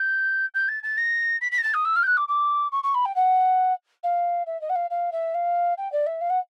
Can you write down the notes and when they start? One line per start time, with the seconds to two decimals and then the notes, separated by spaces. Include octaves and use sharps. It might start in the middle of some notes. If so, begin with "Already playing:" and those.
Already playing: G6
0.54 G6
0.68 A6
0.83 A6
0.97 A#6
1.41 B6
1.51 B6
1.58 A#6
1.63 A6
1.74 D#6
1.84 E6
1.96 F6
2.02 G6
2.06 F#6
2.17 D6
2.28 D6
2.72 C#6
2.83 C#6
2.94 B5
3.05 G5
3.15 F#5
4.03 F5
4.46 E5
4.61 D#5
4.69 F#5
4.75 F5
4.90 F5
5.12 E5
5.34 F5
5.77 G5
5.92 D5
6.06 E5
6.21 F5
6.29 F#5